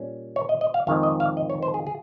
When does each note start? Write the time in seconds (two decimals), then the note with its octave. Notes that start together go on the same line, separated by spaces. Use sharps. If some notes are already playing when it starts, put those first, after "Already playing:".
Already playing: A#2 G3 C#4
0.36 C#5
0.49 D#5
0.61 D#5
0.74 F5
0.87 F2 D#3 G#3 C4 F5
1.03 D#5
1.20 F5
1.37 D#5
1.50 C#5
1.63 C5
1.74 G#4
1.87 G#4